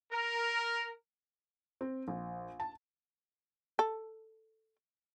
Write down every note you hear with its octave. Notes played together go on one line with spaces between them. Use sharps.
A#4
C4
A#1
A5
A4